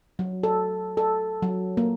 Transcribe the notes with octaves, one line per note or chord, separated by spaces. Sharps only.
F#3
A4
A4
F#3
A#3